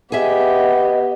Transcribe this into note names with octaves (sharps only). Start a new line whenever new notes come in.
B3 G4 G#4 D#5 E5